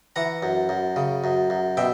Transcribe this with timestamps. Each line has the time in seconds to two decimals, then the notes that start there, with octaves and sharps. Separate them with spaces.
0.16 E3 F#5 A#5
0.43 F#2
0.69 F#2
0.96 C#3
1.24 F#2
1.50 F#2
1.77 B2 E5 G5